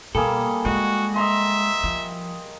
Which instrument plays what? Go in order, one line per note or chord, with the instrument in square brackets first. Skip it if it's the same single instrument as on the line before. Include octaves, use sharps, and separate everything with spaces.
[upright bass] B2 [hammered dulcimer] G3 A#3 G#4 [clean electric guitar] A4
[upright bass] G#3 [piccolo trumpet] F#4
[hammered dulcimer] D#5 A#5 C6 [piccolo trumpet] E5
[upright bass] F3